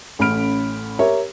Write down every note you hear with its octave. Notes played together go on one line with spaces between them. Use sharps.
A1 A3 C#4 B5 F6 D7
G4 A#4 C#5 E5